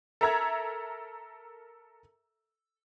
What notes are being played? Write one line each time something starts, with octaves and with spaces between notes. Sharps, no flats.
A4 A#4 E5 A#5 E6 G#6